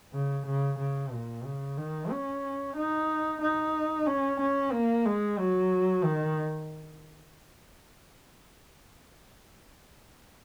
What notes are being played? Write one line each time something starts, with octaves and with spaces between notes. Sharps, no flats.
C#3
C#3
C#3
A#2
C#3
D#3
C#4
D#4
D#4
C#4
C#4
A#3
G#3
F#3
D#3